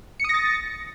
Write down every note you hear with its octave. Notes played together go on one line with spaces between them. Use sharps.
D#6 A6 A#6 C#7